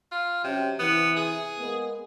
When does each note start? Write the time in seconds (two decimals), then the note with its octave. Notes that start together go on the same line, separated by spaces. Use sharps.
0.12 F4
0.44 C3 F#3 C#4 G4
0.79 C3 E3 B3
1.16 G#4
1.58 G#3 A#3 B3